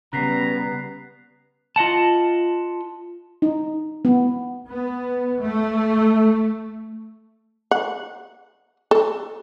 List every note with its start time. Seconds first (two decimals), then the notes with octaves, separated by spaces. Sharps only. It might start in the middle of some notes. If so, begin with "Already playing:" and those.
0.13 C#3 G3 B3 A#5 F#6 B6 C7
1.76 F4 D#5 F#5 A5
3.42 D#4
4.05 B3
4.69 B3
5.40 A3
7.71 F#5
8.91 A4